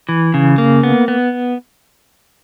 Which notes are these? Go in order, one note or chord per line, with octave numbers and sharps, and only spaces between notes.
E3
C#3
A#3
B3
B3